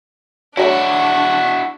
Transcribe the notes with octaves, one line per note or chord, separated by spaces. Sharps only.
F#3 G3 A3 D4 E4 F#4 C#6